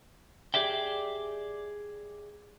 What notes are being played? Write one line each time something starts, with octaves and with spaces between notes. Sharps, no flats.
G4 G#4 D5 E5 G5